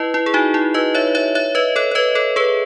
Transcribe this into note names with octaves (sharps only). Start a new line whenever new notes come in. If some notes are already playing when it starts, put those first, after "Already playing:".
Already playing: E4 B4 D#5
E4
G#4
D#4 F#4
E4
B4 D#5
C#5 E5
C#5 E5
C#5 E5
B4 D#5
A4 C#5
C#5
B4 D#5
A4 C#5
G#4 B4